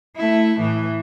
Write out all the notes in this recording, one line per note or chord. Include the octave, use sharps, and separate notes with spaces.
A3 E4
A2 E3